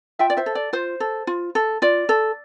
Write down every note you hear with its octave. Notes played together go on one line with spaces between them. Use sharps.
F4 E5 G5
D5
C5 E5
A4
D5
F4 C5
A4
F4
A4
F4 D5
A4